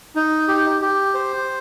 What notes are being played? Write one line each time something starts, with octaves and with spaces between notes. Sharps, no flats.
D#4
G4
G4
C5